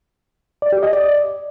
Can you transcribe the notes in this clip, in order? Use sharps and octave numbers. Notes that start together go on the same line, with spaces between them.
D5
G4
D#5
D5